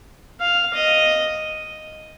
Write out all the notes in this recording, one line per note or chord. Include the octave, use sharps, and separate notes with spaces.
F5
D#5